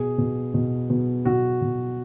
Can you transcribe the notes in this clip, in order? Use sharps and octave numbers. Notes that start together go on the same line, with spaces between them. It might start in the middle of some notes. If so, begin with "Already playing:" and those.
Already playing: B2 G#4
B2
B2
B2
B2 F#4
B2